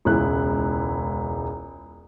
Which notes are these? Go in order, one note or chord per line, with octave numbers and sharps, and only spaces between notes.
E1 C#2 E4 F#6